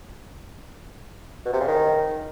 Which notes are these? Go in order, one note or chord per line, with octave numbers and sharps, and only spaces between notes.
B2
C3
C#3
D#3